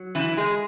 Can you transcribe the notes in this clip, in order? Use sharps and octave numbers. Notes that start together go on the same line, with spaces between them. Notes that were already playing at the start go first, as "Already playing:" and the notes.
Already playing: F#3
E3 E4
G#3 G#4